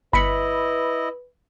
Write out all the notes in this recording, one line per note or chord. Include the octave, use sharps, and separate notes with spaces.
G1 E4 B4 D#5 B5 C#7